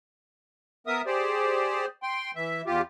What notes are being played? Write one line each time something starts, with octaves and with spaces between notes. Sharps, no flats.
B3 A#4 E5 D#6
G4 G#4 C5 D5
G5 C6
E3 E5
E2 F4 G4